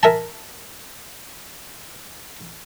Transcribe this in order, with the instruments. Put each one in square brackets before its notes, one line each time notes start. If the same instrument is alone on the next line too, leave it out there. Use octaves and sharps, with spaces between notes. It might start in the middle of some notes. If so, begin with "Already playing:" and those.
[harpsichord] A#4 E5 G#5 A5